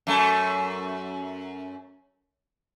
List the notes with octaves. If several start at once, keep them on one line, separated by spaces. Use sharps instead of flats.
F#2 A3